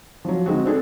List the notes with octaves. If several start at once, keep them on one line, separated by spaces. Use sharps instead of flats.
F3 F#3
D3 G#3 C4 F#4
C4 D4 G#4 A4